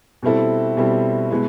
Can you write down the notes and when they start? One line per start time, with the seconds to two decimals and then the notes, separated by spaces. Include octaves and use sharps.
0.23 B2 G3 C4 E4 A4
0.77 B2 G3 C4 E4 A4
1.30 B2 G#3 B3 E4